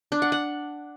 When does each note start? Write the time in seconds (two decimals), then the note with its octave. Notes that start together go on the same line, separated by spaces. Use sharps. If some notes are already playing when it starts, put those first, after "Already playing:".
0.12 D4
0.22 F#5
0.32 F#5